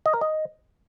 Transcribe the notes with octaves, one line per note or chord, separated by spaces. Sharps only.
D#5
A#4
D#5